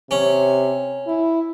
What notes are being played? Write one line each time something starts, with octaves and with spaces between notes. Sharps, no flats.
C3 C#4
E4